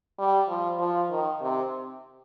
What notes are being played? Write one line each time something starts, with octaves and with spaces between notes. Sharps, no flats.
G3
F3
F3
D#3
C3